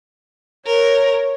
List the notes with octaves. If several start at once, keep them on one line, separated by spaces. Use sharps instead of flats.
A#4 C#5